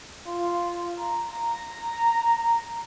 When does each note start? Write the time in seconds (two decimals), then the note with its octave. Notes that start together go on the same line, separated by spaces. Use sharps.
0.26 F4
1.00 A#5